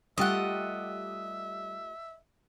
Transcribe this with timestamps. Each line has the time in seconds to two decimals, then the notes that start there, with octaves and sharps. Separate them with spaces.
0.18 G3 A3 F4 G4 D#5 E5 F#5